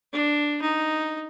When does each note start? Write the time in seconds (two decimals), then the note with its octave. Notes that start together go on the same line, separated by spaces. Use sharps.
0.13 D4
0.61 D#4